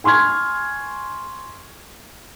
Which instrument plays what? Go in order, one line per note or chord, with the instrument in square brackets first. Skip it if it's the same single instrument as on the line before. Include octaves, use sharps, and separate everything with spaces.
[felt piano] G#5 C6 C#6 F6 G#6